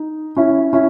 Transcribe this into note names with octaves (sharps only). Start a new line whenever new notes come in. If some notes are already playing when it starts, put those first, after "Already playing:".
Already playing: D#4
C#4 E4
C#4 E4